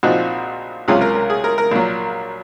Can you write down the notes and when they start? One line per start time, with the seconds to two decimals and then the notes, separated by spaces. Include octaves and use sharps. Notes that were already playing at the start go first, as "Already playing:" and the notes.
0.03 A#1 A#2 F3 C4 D#4 F#4
0.88 C#2 C3 F#3 C#4 F4 G#4
1.01 A#4
1.15 A#4
1.30 G#4
1.44 A#4
1.58 A#4
1.72 A#1 A#2 F#3